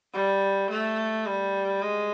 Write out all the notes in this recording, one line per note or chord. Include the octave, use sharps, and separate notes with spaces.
G3
A3
G3
G#3